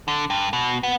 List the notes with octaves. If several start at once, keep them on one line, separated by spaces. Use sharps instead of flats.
D3
G2
B2
B3